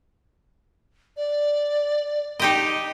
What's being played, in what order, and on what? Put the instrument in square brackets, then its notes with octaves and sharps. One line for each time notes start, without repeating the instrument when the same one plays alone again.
[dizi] D5
[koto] D#4 G4 D#5